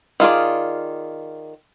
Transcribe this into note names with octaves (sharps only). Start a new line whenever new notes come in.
D#3 F4 G#4 D5